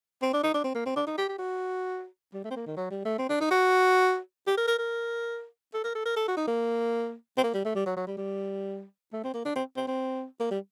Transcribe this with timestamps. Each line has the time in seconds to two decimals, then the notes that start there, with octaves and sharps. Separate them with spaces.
0.22 C4
0.33 D4
0.43 D#4
0.54 D4
0.64 C4
0.75 A#3
0.86 C4
0.96 D4
1.07 D#4
1.18 G4
1.29 G4
1.39 F#4
2.34 G3
2.45 A3
2.51 C4
2.56 A#3
2.67 D#3
2.77 F#3
2.91 G3
3.05 A3
3.19 C4
3.29 D4
3.41 D#4
3.51 F#4
4.47 G4
4.57 A#4
4.68 A#4
4.79 A#4
5.73 A4
5.84 A#4
5.95 A4
6.06 A#4
6.17 A4
6.28 F#4
6.37 D#4
6.47 A#3
7.37 C4
7.43 A#3
7.54 G3
7.65 A3
7.75 G3
7.86 F#3
7.97 F#3
8.07 G3
8.17 G3
9.13 A3
9.24 C4
9.34 A#3
9.45 D4
9.56 C4
9.77 C4
9.87 C4
10.40 A#3
10.51 G3